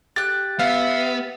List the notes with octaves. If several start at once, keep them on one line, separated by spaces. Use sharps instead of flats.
G4 F#6 A6
B3 E5 F5